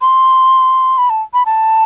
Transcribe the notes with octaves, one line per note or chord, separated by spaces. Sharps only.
C6
B5
A5
B5
A5